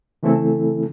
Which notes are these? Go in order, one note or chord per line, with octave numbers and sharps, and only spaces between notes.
C#3 E3 A3 C4 E4 A4